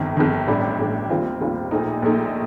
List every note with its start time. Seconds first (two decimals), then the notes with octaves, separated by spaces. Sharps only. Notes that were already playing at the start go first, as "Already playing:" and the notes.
Already playing: G1 F2 D#3
0.17 G1 F2 D#3
0.47 A1 A2 G3 D4
0.78 A1 A2 G3 D4
1.09 D#2 D#3 G3 C4 F4
1.40 D#2 D#3 G3 C4 F4
1.71 A#1 A#2 A3 D#4
2.02 A#1 A#2 A3 D#4